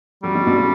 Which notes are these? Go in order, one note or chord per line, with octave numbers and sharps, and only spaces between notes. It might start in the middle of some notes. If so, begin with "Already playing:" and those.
F#3 G3 A3
D3 F#3
B2 D3
C#3